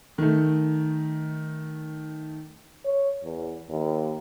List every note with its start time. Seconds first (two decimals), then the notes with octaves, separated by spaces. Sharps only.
0.18 D#3 A3
2.85 C#5
3.24 E2
3.69 D#2